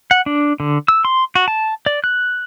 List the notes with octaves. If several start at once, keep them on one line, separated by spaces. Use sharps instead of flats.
F#5
D4
D3
E6
C6
F#4
A5
D5
F#6